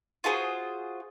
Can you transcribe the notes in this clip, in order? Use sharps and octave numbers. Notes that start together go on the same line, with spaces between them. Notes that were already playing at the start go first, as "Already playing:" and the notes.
F4 F#4 G#4 C5